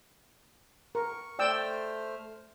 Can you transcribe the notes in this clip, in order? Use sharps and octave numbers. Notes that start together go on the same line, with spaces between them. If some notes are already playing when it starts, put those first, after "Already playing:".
A#4 C#6
A3 C5 D5 G5 E6 F6